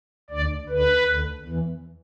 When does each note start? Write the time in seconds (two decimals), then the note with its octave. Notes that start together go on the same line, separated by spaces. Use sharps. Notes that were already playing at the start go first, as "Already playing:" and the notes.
0.30 D2 D3 D5
0.69 D2 D3 B4
1.06 D2 D3
1.45 E2 E3